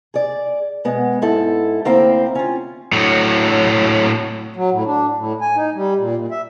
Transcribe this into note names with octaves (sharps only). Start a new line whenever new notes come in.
G#4 D5
B2 G#3 B3
G#2 E4 A4
D2 A#3 C4 E4 F5 G5
C#4 F4
A2 F#3
F#3
A2
D4
A2
G#5
D#4
G3
A#2
A#2
E5